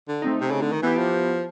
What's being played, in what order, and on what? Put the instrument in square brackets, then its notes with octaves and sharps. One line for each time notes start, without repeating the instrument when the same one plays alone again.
[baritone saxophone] D3
[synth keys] A3 C4 D#4
[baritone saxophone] C3
C#3
D3
D#3
[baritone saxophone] E3 [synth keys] B3 E4 G4
[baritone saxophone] F3